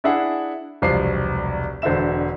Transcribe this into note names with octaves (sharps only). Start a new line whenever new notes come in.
D4 E4 G#4 E5 F#5
E1 C2 F3 C7
E1 D3 C5 E5 E7